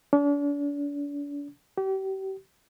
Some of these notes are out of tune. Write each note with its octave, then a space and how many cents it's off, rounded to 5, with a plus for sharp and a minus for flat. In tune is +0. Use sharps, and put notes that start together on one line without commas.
D4 -40
G4 -35